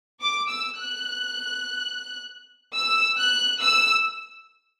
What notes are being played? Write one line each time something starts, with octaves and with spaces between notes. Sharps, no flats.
D6
E6
F#6
E6
F#6
E6